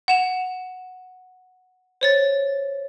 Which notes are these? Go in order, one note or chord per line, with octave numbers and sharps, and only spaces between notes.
F#5 E7 F7
C5 C#5 A6